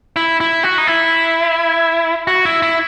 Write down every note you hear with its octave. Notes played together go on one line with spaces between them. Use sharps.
E4
E4
F#4
D#4
E4
F#4
E4
E4